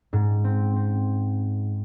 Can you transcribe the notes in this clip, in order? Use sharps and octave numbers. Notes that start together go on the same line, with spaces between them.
G#2
C4
C4